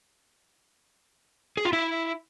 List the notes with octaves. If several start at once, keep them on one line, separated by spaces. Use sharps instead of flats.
G#4
F4
E4